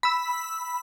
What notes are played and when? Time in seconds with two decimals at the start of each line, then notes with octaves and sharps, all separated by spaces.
0.03 B5 E6